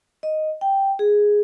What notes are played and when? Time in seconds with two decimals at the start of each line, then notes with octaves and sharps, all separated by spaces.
0.23 D#5
0.61 G5
0.99 G#4